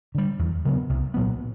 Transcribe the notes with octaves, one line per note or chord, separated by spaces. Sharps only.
D3 G3
E2
C#3 F#3 B3
C2
A#2 F#3 B3